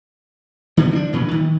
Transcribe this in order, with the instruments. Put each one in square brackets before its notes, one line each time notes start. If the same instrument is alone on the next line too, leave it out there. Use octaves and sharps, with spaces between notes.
[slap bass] D3 G3 A3 B3
F3 C#4 D4
A1 A#2 E3 F#3
D#3